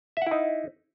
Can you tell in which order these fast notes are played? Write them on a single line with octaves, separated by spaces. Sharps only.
E5 F#5 E4 D#4